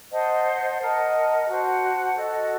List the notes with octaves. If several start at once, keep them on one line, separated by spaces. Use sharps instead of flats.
C5 D#5 F#5 A5
A#4 D#5 F#5 A5
F#4 C5 F#5 A5
F#4 A4 D#5